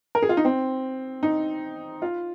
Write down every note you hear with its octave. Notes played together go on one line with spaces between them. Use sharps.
A#4
G#4
F4
D#4
C4
D#4
F4